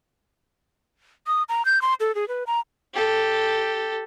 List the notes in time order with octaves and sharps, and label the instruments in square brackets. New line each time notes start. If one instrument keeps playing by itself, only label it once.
[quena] D#6
A#5
G6
C6
A4
G#4
B4
A#5
[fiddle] G4 A4